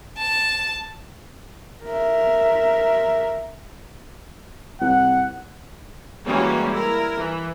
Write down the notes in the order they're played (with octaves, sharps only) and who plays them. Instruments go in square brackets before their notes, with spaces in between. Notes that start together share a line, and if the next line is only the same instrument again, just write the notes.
[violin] A5
[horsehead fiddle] A#4 E5
[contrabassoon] C2 [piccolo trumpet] F#5
[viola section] E3 G3 G#3 A#3 C#4 F#4
E4 A#4
E3